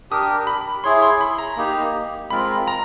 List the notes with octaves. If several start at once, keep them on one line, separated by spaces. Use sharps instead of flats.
D4 G4 A#4 D#6
B5
E4 G#4 C#5 C6
C6
B5
A#5
A#3 D#4 G4
G#3 C4 F4 A#4 B5
A#5